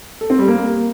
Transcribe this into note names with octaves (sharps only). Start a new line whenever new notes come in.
A4
C4
G3
A#3